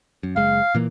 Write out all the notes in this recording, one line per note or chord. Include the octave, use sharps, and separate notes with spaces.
F#2
F#1 G#3 F5
A#2 E3 A#3